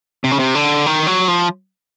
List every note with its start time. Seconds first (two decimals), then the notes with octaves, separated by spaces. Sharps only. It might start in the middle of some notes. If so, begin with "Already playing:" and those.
0.24 C3
0.31 C#3
0.39 C3
0.55 D3
0.86 D#3
1.07 F#3
1.28 F3